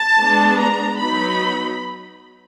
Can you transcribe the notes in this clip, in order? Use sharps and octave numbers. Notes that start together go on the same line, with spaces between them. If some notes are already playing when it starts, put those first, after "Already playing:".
Already playing: A5
G#3 B3 D4
A#5
F#3 B3 D#4 B5